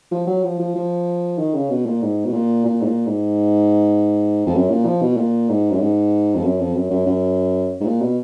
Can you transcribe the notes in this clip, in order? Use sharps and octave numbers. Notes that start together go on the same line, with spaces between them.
F3
F#3
F3
F3
F3
D#3
C#3
B2
A#2
G#2
B2
A#2
A#2
G#2
A#2
G#2
F2
F#2
A#2
F3
B2
A#2
G#2
F#2
G#2
F2
F#2
F2
F#2
F#2
F#2
G#2
A#2
B2